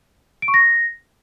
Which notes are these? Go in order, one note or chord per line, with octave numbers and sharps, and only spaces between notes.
D7
C#6
A#6